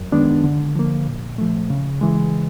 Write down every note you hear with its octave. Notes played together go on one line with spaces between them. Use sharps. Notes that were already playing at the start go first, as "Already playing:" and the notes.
Already playing: F#2
D#3 G#3 B3 D4
D3
F3 A#3
A#2
F3 A3
C#3
E3 G#3